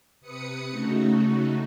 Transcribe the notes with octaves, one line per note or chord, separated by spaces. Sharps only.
C3 B4 D#6 C#7
C#3 A3 D#4 F#4